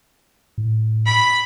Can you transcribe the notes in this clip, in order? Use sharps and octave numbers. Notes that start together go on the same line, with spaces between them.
A2
B5